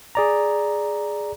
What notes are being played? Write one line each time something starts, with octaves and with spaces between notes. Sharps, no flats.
G#4 D5 A#5